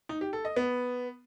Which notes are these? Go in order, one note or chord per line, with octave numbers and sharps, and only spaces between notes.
D#4
G4
A4
D#5
B3